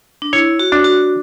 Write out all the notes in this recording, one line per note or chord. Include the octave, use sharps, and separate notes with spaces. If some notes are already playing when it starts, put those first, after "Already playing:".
D4
E4 C#5
F#4
D4
F#4